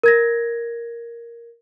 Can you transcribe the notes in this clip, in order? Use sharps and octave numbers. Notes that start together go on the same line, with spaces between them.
A#4 G#6 A#6